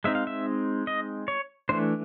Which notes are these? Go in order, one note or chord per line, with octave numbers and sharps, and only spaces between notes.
G#3 C4 D#4 E5
F5
E5
D#5
C#5
E3 A3 D4 C5